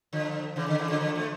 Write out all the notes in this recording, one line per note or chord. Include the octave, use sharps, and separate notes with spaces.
D3 F3
C#3 E3
D3
C#3 E3
D3 F3
D3 F3
F3 A3